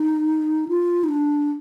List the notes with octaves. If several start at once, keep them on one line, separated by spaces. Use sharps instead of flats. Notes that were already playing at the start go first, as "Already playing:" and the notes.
Already playing: D#4
F4
D#4
D4